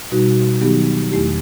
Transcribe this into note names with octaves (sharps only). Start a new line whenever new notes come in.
B2 G3 D#4 F#4
D#3 F#3 B3 D#4 G4
E2 D#3 A3 E4 G4